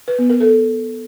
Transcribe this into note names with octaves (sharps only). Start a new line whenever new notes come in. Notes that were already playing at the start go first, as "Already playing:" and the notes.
B4
B3
A#4
A4